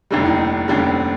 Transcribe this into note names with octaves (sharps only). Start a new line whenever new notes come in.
F1 D#2 D3 G3 D#4
E4
D#4
D#4
D4
F1 D#2 D3 G3 C#4
C4